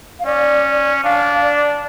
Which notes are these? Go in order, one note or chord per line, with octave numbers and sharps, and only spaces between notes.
F5
C#4 D5
D4 F5
D5